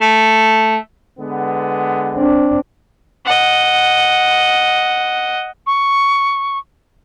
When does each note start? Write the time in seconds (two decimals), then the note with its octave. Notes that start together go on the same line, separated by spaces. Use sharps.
0.01 A3
1.19 D3 G#3 B3
2.15 C4 D4
3.25 D#5 F#5
5.67 C#6